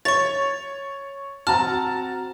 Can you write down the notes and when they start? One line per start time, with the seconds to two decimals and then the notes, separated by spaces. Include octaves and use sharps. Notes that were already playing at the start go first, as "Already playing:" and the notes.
0.05 C#5 C#6 A6
1.47 C4 F#4 A5 A#5 F6